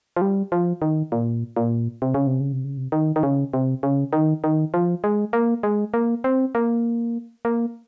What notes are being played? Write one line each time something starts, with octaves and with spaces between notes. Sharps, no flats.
F3
G3
F3
D#3
A#2
A#2
C3
C#3
C3
C#3
C3
C#3
C3
D#3
D#3
C#3
C3
C#3
D#3
D#3
F3
G#3
A#3
G#3
A#3
C4
A#3
A#3